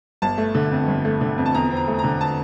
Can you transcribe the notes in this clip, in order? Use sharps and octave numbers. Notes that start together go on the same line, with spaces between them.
G1 A5
A3
D3
F2
G1
A3
D3
F2
A5
E2 A#5
C4
A#5
A3
A#5
D3
A5